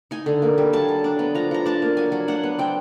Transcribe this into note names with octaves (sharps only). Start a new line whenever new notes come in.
D#4 G#5
D3
A#3
G3
F#3 A5
F#3
D4
B3
F3 A#5
F3 A#5
D4 A5
A#3
F#3 G#5
F#3
D4 F#5
B3
C4 G5